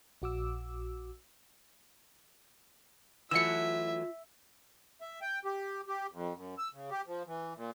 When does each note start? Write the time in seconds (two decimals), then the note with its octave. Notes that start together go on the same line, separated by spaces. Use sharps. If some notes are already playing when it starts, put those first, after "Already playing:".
0.22 A#1 F#4 D6 E6
3.31 E3 F#3 A3 F4 E5 E6 C#7
5.01 E5
5.22 G5
5.45 G4
5.88 G4
6.12 F2
6.35 F#2
6.58 E6
6.74 C#3
6.91 G4
7.07 F3
7.27 E3
7.56 A#2